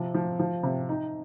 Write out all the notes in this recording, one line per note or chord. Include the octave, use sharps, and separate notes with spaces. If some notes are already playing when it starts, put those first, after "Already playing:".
Already playing: C3 F3
F3
F3
C3
D#4